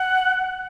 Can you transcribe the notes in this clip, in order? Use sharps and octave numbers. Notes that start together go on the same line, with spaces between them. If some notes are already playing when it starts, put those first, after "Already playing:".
Already playing: F#5